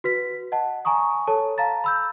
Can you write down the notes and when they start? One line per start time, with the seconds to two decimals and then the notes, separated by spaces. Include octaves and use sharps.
0.04 F#4 B4 B6
0.52 D#5 F#5 A5
0.85 G#5 A#5 C#6 D#6
1.27 A4 C#5 A5
1.58 F5 A5 A#5 A6
1.84 B5 E6 G6